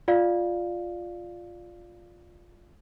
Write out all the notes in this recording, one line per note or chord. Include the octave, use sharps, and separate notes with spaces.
F4 D5 F5